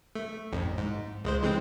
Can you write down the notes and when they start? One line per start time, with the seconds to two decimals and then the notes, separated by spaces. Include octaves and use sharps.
0.15 A3
0.52 A1 F2
0.78 G#2
1.24 C#2 G#3 C5
1.43 E3 G#3 C4